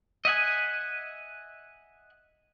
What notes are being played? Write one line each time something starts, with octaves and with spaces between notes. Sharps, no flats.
D#5 E5 F#5 G#5